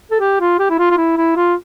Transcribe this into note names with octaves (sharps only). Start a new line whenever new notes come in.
A4
G4
F4
G4
E4
F4
F4
E4
E4
F4